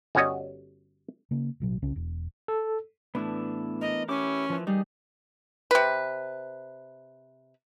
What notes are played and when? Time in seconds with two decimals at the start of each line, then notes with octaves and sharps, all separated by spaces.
0.15 G1 G3 C#4 F#4 C#5 D#5
1.31 C#3 A#3
1.60 A1 B2 F#3
1.82 C2 C#3 C#4
1.96 E1
2.48 A4
3.15 A2 E3 B3 D4 E4
3.81 A#4 D#5
4.09 C#4 E4 G4 D6
4.50 E3 F3
4.67 G3 D#4 G#4
5.71 C3 B4